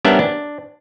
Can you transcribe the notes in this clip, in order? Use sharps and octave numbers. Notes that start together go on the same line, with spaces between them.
G3 B3 C#4 D4 A#4 E5
D4